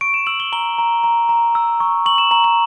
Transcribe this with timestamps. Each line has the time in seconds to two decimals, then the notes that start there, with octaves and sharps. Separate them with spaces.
0.01 C#6 D7
0.14 E7
0.27 E6 F#7
0.40 G7
0.53 A#5 G7
0.79 A#5
1.04 A#5
1.29 A#5
1.55 E6
1.80 C#6
2.06 C#6 F#7
2.18 E7
2.31 A#5 F#7
2.44 F#7